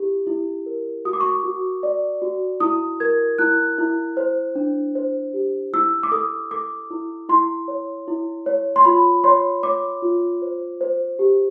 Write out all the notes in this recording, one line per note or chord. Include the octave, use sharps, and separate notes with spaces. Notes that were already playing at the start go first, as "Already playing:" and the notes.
Already playing: E4 G4
E4
A#4
F#4 D#6
D6
C#6
D6
F#4
D5
F#4
E4 D#6
A#4 G#6
E4 F#6
E4
C5
D4
C5
G4
E4 E6
D6
A4 D#6
A4 D6
E4
E4 C6
C#5
E4
C#5
C6
F4 B5
C#5 C6
C#5 D6
F4
C5
C5
G4